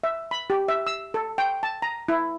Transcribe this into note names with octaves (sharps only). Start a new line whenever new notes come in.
E5
B5
G4
E5
E6
A4
G5
A5
A#5
E4